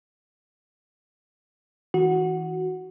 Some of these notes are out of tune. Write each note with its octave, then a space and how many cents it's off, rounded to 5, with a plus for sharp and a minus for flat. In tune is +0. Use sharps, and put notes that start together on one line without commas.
E3 -30 F#4 +0